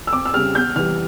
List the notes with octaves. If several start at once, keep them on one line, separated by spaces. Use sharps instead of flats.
E6
F2 D6
E6
C#3 G3 F6
E2 G6
E3 G3 F6